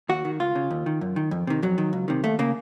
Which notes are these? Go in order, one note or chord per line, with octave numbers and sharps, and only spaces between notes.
D#2 F#4
D#3
C#2 F4
C#3
D#2
D#3
F#2
D#3
F2
C3 D#3
F2 F#3
D#3
C#2
C3 D#3
D#2 A3
C#3 A#3